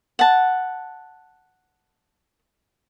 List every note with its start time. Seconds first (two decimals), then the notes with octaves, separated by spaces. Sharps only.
0.19 F#5 A5